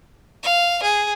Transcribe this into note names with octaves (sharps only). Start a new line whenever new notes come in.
F5
G#4